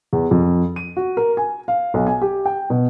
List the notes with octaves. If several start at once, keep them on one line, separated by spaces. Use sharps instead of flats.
E2
F2
D#7
F#4
A#4
G#5
F5
B1
G#5
G4
G5
B2